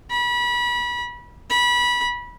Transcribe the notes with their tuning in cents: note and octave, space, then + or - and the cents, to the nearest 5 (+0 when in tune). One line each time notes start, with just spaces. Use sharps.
B5 -30
B5 -20